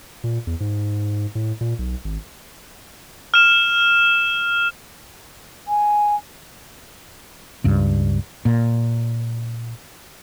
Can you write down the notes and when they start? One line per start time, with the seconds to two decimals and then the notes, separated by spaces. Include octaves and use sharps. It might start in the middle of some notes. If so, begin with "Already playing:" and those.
0.24 A#2
0.47 E2
0.60 G#2
1.35 A2
1.61 A#2
1.79 B1
2.04 G#1
3.34 F6 E7
5.67 G#5
7.64 C#2 G2
8.45 A#2